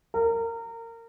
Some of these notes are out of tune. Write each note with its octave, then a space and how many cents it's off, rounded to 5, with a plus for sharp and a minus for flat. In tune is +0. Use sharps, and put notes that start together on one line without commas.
A#4 -25